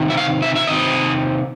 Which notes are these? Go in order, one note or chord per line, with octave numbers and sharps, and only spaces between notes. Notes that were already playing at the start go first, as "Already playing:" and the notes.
Already playing: C3 D#3
E5
F5
E5
E5
C3 D#3 C4 D#5